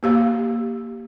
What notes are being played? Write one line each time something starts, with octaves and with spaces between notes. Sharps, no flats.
A#3 G4 F5